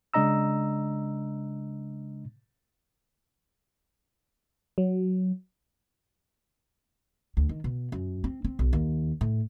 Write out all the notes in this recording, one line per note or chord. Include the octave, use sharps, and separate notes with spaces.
C#3 G#3 D4 D#5 A#5 E6
F#3
D2
D#3
B2
F#2
C4
C4
B1
D#2
A2